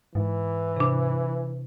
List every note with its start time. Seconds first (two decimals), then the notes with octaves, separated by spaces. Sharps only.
0.15 G#2 E3
0.77 C3 D4